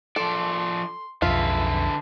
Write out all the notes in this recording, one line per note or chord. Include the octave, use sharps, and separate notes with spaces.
F3 A4 D5 C6
B1 F2 D3 G#3 F4 B4 E5